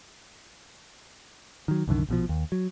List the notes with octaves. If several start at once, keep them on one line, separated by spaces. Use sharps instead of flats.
D#3 F#3
C2 F#2 D3 D#3
A#1 B2 F3
D#2
F#3